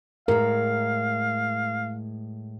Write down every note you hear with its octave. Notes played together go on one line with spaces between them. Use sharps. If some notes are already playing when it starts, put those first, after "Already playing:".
A2 G#3 A#4 F5